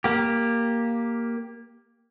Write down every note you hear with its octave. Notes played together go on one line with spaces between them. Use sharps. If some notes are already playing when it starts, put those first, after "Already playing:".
A#3 G4